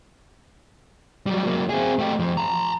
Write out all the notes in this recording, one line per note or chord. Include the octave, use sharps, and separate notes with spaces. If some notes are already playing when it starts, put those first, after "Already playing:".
F#3 G3
F#3 A#3
C4 G#4
A3 G4
F2 F3
A5 A#5